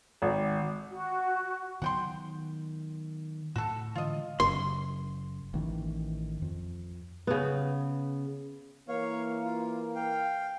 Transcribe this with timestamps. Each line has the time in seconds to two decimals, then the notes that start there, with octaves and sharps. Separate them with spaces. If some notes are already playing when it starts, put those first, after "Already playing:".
0.22 G#1
0.91 F#4
1.82 D#3 F#3 B3 F#5 G5 C6
3.56 A2 F#4 A4
3.95 D3 E3 G#3 F4 D#5
4.40 F#1 F#2 C#3 C6
5.54 A1 D#3 E3
6.42 F2
7.27 C#3 B3
8.88 E3 A#3 C#5 F5
9.44 F4
9.95 F5 G5